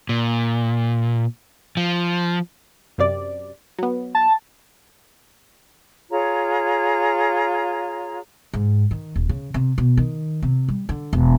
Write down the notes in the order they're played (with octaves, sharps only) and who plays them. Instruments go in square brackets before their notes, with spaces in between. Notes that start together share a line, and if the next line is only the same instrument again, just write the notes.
[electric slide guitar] A#2
F3
[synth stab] F#2 C3 D5
F#3 B3
[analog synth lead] A5
[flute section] F4 G#4 C#5 A#5
[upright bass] G#2
D#3
D#1
C#3
C3
B2
D#3
C3
G3
D3
E1